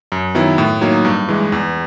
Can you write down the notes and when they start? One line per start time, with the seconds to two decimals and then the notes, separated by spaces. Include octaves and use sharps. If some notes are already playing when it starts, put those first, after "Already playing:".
0.12 F#2
0.35 D#3 F#3 B3 E4
0.58 A2
0.81 F#3 A#3 D#4
1.05 G2
1.29 E3 G#3
1.52 E2